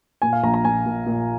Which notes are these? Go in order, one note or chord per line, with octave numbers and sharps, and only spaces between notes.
A#2 G#5
F5
A#1 A#5
A#5
A#2 G#5
A#2
A#2